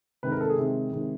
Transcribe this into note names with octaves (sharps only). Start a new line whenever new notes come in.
C3 D#3 G#3 B4
A#4
A4
G#4
C3 D#3 G#3
C3 D#3 G#3